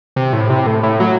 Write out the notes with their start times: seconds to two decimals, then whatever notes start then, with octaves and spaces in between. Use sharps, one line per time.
0.16 C3
0.33 A2
0.50 C3
0.67 A2
0.83 A2
1.00 F#3